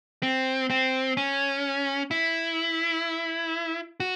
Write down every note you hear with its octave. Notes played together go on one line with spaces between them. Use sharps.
C4
C4
C#4
E4
F#4